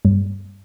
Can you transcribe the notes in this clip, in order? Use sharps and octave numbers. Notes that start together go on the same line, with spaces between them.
G2